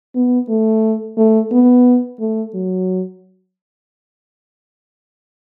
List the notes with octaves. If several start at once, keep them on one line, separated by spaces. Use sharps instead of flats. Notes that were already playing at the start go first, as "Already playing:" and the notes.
B3
A3
A3
B3
A3
F#3